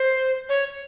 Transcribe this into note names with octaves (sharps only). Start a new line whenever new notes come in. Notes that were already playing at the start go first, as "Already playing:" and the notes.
Already playing: C5
C#5